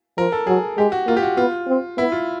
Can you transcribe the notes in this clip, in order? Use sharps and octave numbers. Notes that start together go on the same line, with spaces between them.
F3 A#4
A4
F#3 G#4
G#3 G4
F#4
A#3 F4
G4
F#4
B3 F4
C4
B3 E4
F4